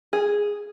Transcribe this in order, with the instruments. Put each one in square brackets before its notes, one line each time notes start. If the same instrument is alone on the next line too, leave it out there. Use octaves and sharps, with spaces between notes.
[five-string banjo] G#4